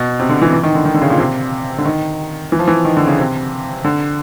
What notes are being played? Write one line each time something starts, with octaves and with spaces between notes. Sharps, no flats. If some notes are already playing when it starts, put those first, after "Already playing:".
Already playing: B2
C3
D3
E3
E3
D#3
D3
D#3
D3
C#3
A#2
C3
D3
D#3
E3
F3
E3
D#3
D3
C#3
C3
D3